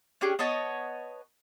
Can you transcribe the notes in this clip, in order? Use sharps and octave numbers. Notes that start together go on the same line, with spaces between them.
C#4 D4 G4 G#4
B3 C#5 D#5 A5